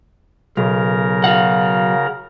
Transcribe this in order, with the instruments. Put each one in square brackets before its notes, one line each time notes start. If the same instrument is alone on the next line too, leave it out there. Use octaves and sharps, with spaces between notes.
[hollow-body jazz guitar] B1 [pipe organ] C#3 A#4 A#5
[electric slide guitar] F#4 F5 F#5